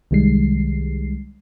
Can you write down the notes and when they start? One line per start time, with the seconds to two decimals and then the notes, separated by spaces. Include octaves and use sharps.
0.11 C2 D#3 G3 G#3 C7